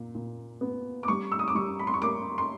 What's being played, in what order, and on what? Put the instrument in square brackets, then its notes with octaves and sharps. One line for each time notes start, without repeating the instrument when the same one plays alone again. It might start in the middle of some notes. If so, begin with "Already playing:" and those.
Already playing: [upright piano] A#2
A#2
B3
D6
G3 C#6
E6
D#6
D6
G3 C#6
B5
C6
C#6
A#3 D6
C6